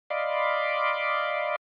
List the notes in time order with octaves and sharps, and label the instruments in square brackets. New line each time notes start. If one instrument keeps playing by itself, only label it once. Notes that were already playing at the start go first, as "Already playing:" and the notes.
[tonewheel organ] D5 D#5 F5 B5 C6 D6